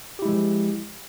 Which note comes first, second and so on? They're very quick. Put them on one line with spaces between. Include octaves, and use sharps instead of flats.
G4 E4 G#3 F3